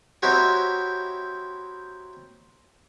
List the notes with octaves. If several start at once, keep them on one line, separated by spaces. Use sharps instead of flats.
C4 D#4 E4 F#4 G4 C#5